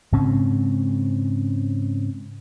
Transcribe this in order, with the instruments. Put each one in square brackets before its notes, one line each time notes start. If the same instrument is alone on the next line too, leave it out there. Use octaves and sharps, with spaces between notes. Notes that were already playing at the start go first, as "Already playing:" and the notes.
[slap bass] G#2 C#3 C4 C#4